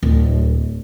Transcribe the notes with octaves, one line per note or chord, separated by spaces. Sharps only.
D1